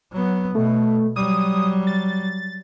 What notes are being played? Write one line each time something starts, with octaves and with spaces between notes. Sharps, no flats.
F#3 B3
B2 A3
F#3 G3 D#6
A6